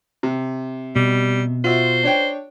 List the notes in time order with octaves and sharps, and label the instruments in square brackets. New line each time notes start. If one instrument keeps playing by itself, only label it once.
[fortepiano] C3
[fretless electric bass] B2 [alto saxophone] G3
[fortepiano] F4 F#4 E5 [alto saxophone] C5
[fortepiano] D4 C#5 G5